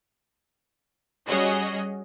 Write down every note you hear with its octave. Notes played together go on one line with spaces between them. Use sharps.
G3 C#4 F#4 G#4 C#5 D#5